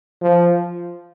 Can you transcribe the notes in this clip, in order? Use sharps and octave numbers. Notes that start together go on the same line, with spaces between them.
F3